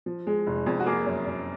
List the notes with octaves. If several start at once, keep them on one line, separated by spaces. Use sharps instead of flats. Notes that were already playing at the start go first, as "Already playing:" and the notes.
F3
G#3
F1
F2
F#4
A#3 G#4
F#2
F#2